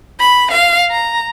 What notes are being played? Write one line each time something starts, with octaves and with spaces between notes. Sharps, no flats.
B5
F5
A#5